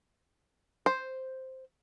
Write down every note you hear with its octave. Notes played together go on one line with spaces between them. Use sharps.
C5